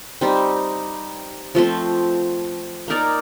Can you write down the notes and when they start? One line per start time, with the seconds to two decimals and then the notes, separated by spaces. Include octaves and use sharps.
0.21 G3 C4 D#4
1.55 F3 A3 C4
2.88 A#3 D#4 A#4 D5